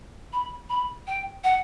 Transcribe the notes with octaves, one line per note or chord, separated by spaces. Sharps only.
B5
B5
G5
F#5